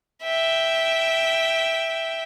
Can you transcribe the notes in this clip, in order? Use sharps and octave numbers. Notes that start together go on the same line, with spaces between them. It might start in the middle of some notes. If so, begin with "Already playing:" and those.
E5 G5